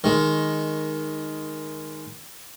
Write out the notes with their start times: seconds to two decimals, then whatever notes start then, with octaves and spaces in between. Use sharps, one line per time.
0.04 D#3 G#3